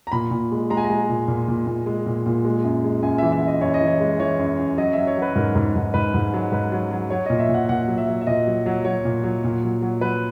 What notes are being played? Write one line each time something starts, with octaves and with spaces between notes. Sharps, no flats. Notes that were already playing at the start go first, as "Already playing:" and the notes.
A#5
A#2 B5
A#2
G#3
G#3 A#5
G#5
A#5
G#3
A#2
A#2
A#2
A#2
G#3
A#2
A#2
G#3
F#2
G#3
F#2 G#5
E3 E5
E5
F#2
D#5
F#2 C#5
D#5
E3 C#5
G#3
E3 C#5
F#2
F#2
F#3 D#5
F#3 E5
C#5
F#3 B4
G#2 A#4
G#2
G#2
G#2 B4
G#2
F#3
G#2 B4
F#3
F#3
F#3 C#5
A#2 D#5
E5
A#2
F#5
A#2 F#5
F#3
E5
F#3
E5
A#2 D#5
F#3
F#3
F#3 C#5
A#2
F#3
A#2
F#3
F#3
F#3 B4